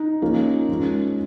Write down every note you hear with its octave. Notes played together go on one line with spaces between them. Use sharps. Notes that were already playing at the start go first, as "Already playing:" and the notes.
Already playing: D#4
F3 A#3 C#4
F3 G#3 C#4